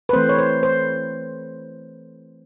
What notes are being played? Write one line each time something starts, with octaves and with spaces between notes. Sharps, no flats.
B4
E3 A3 C4 C5
C#5
C5
C5